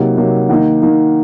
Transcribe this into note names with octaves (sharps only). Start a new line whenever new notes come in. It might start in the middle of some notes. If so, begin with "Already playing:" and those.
Already playing: C3 F#3 A#3 D#4 F#5
C3 F#3 A#3 D#4
D#3 A#3 D#4 F#5
D#3 A#3 D#4